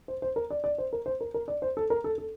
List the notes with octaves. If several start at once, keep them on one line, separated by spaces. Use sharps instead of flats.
C5
C5
A#4
D5
D5
C5
A#4
C5
A#4
A#4
D5
C5
A4
A#4
A4
A4